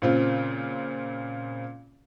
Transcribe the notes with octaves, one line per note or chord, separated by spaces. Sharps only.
A#2 C#3 C4 F4